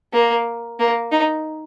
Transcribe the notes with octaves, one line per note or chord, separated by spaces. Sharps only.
A#3
A#3
D#4